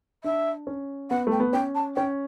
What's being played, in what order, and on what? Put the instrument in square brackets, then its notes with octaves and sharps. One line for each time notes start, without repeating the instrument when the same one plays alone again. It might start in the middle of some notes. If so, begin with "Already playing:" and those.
[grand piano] D4 [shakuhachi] E5
[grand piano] C#4
[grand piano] B3 [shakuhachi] F#5
[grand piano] A3 [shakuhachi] G5
[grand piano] B3
[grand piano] C#4 [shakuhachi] G5
[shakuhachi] A5
[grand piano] C#4 [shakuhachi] G5